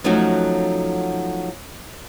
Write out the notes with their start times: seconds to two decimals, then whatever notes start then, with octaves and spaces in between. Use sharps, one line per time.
0.04 F3 F#3 A3 C#4 D#4 F#4